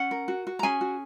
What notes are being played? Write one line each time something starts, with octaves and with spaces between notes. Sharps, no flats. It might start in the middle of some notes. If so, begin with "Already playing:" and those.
Already playing: C#4 F#5
A#4
F#4
F#4
A#5
C#4 G#4 G#5
F#4